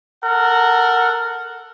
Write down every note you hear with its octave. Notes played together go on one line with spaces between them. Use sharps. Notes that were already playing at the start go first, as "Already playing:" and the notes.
A4 A#4 F#5